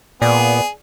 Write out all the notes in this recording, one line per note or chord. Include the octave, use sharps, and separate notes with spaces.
A#2 B3 G#4 D5